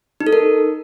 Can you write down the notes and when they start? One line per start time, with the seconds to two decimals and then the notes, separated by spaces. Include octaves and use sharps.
0.20 D#4
0.27 A4
0.33 A#4